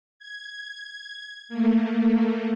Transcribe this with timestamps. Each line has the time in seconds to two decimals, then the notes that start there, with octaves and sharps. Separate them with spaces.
0.19 G#6
1.49 A3 A#3